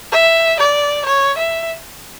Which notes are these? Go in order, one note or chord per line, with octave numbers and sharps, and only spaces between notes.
E5
D5
C#5
E5